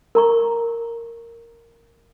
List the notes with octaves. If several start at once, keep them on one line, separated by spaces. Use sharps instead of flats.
A#4 A#5 C#6